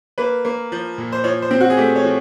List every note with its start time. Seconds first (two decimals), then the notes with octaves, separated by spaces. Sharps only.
0.18 A#3 B4
0.45 A#3
0.72 F3
0.98 A#2
1.12 C5
1.24 F3 C#5
1.42 C5
1.51 C4
1.60 F#4
1.70 G#4
1.77 A3 G4
1.96 C#5
2.04 F3